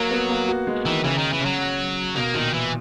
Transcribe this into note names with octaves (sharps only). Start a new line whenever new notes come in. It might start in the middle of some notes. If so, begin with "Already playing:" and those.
Already playing: F#3 A#3
B3
A#3
F#4
G#3
D#3 E3
C#3 E3
D#3
E3
C#3 F#3
B2 A#3
A#2 D#3
E3